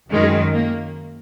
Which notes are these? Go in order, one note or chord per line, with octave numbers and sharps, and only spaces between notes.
F#2 D#3 F#3 G#3
A#3